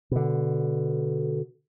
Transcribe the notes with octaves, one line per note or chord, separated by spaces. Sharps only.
B2 D3